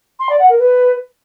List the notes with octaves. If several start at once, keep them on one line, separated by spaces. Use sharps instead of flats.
C6
D5
F#5
A#4
B4